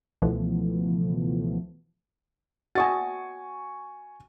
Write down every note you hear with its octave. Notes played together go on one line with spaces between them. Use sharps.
C#2 B2 E3 F3 A3 B3
F#4 D#5 G#5 A5 C#6 A6